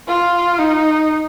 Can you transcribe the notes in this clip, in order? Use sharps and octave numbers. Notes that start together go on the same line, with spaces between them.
F4
D#4